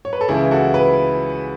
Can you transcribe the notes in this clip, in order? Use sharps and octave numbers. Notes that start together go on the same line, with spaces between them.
C#5
B4
A4
C#2 C#3 E3 E4 G#4
F#4 A4
B4